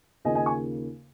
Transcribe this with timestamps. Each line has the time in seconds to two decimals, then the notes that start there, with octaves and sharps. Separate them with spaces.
0.25 D#2 C#3 A#3 F4 D#5 G#5
0.35 D#5 G#5
0.46 G#5 C#6